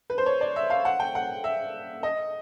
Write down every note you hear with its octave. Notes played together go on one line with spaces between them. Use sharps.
B4
C5
C#5
D5
E5
F5
F#5
G5
F#5
E5
D#5